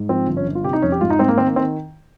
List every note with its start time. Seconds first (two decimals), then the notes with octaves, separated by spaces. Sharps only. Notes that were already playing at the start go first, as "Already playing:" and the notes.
Already playing: G#2
0.09 F3 C4
0.27 G1
0.37 C#4
0.46 G1
0.55 F4
0.64 C3 G4
0.73 D#4
0.82 F2 C#4
0.92 G4
1.01 G#2 F4
1.10 D#4
1.19 G#2 C4
1.28 A#3
1.38 D#3 C4
1.47 A#3
1.56 D#3 C4